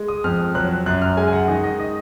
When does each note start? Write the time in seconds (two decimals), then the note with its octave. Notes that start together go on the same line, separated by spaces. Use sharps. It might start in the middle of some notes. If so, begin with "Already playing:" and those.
Already playing: G#3
0.08 D#6
0.24 F2 F6
0.55 F#3 F#6
0.86 F#2 F#6
1.02 F6
1.17 G#3 G#5
1.28 G#5
1.33 F#5
1.48 D#3 D#5
1.64 D#5
1.80 D#5